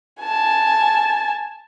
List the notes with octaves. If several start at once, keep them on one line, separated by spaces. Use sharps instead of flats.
G#5 A5